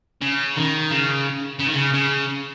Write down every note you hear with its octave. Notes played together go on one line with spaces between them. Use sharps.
C#3
D#3
C#3
C#3
D#3
C#3
C#3